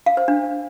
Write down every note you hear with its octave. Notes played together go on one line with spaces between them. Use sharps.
F5
C5
D4